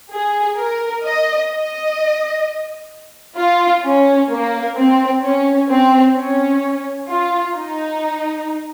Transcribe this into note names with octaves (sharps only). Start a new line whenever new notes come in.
G#4
A#4
D#5
D#5
F4
C#4
A#3
C4
C#4
C4
C#4
F4
D#4